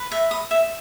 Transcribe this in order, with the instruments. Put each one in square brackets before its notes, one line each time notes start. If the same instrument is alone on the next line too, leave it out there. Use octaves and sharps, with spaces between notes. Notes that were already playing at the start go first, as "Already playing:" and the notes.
Already playing: [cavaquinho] B4
E5
D#6
E5